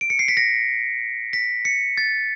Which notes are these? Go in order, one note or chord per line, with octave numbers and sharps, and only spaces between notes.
D7
C#7
C7
B6
A#6
B6
C#7
A6